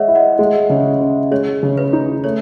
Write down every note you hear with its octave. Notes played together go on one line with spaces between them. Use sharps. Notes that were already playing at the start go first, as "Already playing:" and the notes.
Already playing: G#3 C#5 D#5 E5 F#5
E4
D#5 F#5
G#3
C#3
C#4
G#3 C#5
C#3
B4
D#4
A3 C#5